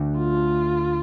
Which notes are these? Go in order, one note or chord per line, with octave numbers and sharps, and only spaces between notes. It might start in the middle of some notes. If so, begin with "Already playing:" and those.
Already playing: D2 D3 A3 D4
F4